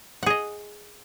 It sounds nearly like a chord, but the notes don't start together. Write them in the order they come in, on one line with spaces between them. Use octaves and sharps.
F#5 G#4 D#5